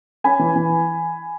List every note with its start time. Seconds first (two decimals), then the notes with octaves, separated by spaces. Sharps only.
0.24 C#4 G#5 B5
0.39 E3
0.56 E3